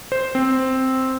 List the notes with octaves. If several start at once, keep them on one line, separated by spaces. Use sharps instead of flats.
C5
C4